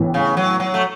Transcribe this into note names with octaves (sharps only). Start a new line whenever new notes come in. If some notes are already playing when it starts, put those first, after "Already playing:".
Already playing: A1 A2 E3 B3
C#3
F#3
F#3
A3